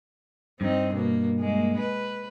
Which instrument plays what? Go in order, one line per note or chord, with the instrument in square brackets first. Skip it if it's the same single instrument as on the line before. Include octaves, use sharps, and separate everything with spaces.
[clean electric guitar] G2 [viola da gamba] C4 D#4
[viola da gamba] B2 A#3
G#3 A#3
B4